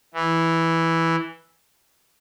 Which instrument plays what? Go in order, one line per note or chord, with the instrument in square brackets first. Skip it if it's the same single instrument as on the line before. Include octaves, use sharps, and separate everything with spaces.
[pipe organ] E3